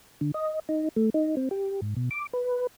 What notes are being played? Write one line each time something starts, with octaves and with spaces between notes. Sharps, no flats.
D3
D#5
D#4
A3
D#4
C4
G4
G#2
B2
D6
B4